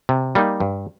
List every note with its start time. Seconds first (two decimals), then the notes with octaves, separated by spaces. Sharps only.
0.09 C3
0.35 G3 A#3 D#4
0.60 G2